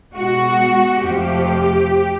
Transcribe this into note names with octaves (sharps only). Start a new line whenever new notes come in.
B2 G#3 F#4
F2 C3 F3 A3 G4